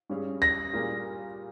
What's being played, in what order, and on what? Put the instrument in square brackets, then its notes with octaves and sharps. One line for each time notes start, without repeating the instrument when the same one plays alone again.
[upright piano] G2 G3 C#4 G#4
[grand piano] A#6
[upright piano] A#2 G3 A#3 F4 G#4